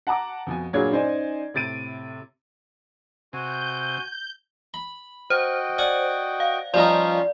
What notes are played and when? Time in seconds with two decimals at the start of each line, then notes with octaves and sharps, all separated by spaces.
0.07 F#5 A5 A#5 D6
0.47 F2 B2 G#5
0.73 G2 A#2 F#3 G#4 C#5 G#6
0.92 C#4 D#4 C5 D5 G#5
1.54 A2 C3 A6 D7 D#7
3.33 C3 F#4 G#5 G6
4.74 B5
5.30 F#4 C5 D#5 G5
5.78 D5 F#5 G#5
6.40 F5
6.74 F3 G3 C#4 D#4 F4 D5 C6